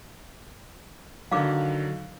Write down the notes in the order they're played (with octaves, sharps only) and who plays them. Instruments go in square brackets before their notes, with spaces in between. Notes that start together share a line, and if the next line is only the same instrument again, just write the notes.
[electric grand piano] D3 D#3 F#3 [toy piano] F5 D6